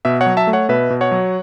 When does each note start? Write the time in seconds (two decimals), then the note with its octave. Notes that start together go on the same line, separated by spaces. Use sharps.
0.05 B2 B4 E5
0.21 C#5 F#5
0.26 F#3
0.37 E5 A5
0.47 A3
0.53 C#5 F#5
0.69 B2 B4 E5
0.90 B2
1.01 C#5 F#5
1.12 F#3